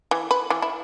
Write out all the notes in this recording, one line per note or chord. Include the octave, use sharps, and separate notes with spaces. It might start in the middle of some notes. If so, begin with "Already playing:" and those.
E3
B4
E3
E4